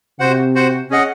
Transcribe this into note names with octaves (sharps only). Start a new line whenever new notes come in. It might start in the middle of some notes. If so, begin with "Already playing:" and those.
C3 F#4 C5 F#5
F#4 C5 F#5
C#4 G#4 D#5 F#5